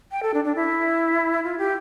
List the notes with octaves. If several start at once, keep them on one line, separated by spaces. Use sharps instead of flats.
G5
A4
D4
D4
E4
F4
G4